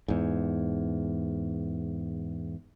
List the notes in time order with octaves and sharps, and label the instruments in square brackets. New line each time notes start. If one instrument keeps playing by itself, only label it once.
[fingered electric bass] E2 G#2